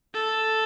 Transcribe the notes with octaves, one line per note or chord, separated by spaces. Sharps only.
A4